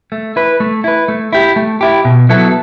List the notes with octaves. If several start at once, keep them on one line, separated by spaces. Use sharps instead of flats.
A3
E4 B4
A3
E4 B4
A3
E4 G4
A3
E4 G4
B2
F#3 B3 E4 A4